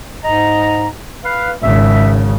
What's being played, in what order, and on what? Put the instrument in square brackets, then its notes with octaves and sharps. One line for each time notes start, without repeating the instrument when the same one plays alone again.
[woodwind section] G#2 D#5 A#5
B4 F5
[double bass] G#1 C#3 [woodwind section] E5